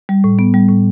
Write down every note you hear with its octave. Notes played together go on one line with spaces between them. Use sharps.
G3
A2
B3
G3
A2